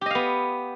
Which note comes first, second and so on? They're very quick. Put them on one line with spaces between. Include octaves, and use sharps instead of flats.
G4 D#5 F5 B3